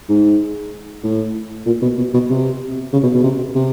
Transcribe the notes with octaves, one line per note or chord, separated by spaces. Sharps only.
G#2
A2
A#2
B2
B2
B2
C3
C#3
B2
B2
C3
C3